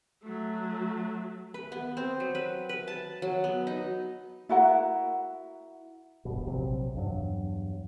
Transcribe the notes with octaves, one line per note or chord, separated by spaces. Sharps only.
F#3 A3
B4
B3
C4
F#3
B4
B4
A5
F#3
B3
D#4
E4 F#4 A#4 F#5
E1 G2 B2 B3
A#1 C3 F#3 C4
E2 G2 F#3